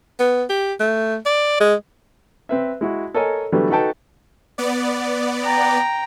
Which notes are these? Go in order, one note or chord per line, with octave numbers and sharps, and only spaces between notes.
B3
G4
A3
D5
G#3
C4 B4 E5
G#3 E4 F#4
A4 A#4 C#5 D#5 G#5 A#5
D3 E3 F#3 G3 A3 B3
D#4 F#4 A4 B4 G5 A5
B3 D5
G5 A#5